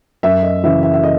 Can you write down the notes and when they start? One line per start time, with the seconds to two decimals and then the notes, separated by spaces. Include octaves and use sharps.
0.23 F#2 E5
0.43 D#5
0.64 C#3 E3 E5
0.83 E5
0.94 E5
1.03 D#5